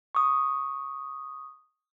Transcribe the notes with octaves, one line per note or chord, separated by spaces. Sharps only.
C#6 D#6